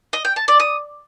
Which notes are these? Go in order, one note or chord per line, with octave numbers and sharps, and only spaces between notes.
D#5
G5
A5
D5
D#6